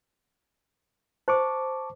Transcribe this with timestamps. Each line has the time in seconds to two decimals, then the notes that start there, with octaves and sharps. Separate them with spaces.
1.28 C5 A5 C#6 D6